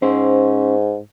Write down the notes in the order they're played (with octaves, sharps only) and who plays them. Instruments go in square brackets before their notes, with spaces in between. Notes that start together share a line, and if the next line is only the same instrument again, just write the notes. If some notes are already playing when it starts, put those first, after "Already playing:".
[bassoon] G#2 [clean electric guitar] C#4 C5